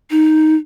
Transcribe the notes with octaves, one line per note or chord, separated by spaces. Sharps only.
D#4